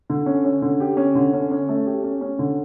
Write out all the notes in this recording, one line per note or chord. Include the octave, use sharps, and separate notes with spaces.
D3
C#4
C#4
D3
G4
C#4
D3
C#4
C#4
A3
G4
C#4
C#4
D3